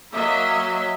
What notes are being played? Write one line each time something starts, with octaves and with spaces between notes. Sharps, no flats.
F#3 A#3 D#5 E5